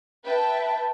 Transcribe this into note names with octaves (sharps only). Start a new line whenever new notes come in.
B4 E5 G5 A5